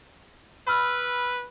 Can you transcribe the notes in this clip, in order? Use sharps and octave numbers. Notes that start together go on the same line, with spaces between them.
B4 B5 E6 F6